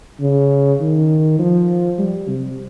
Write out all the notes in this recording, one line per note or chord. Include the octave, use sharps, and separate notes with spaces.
C#3
D#3
F3
G3
C3